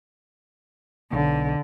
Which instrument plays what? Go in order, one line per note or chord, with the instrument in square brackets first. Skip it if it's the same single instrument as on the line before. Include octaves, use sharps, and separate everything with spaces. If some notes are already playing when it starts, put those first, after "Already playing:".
[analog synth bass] B1 [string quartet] D3